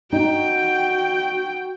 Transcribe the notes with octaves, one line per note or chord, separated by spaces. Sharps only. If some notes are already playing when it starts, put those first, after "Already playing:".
D#4 F#4 G5